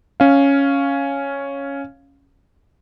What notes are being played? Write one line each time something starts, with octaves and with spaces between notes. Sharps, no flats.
C#4 F5